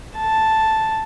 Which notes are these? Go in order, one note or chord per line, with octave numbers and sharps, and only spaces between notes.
A5